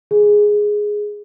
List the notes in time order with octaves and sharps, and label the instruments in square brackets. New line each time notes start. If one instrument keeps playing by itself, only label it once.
[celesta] G#4